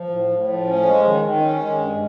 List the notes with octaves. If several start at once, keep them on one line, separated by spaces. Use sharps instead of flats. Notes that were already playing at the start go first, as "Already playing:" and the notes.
Already playing: F3
A2
A2
F3
C#4
G#3
D#3
D#3
C#4
G#3
G2